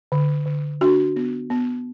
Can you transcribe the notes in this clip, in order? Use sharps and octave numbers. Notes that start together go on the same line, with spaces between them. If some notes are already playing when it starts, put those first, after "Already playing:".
D3
D3
D4 F#4
B3
B3